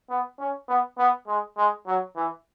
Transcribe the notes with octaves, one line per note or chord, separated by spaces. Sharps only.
B3
C#4
B3
B3
G#3
G#3
F#3
E3